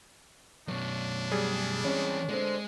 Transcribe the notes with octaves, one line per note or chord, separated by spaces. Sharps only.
F#2 B2 D4 C#5
G3 G#4
E3 G#3 C4 C#4
D3 G#3 C4